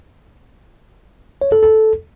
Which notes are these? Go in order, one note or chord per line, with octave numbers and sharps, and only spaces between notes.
C#5
A4
A4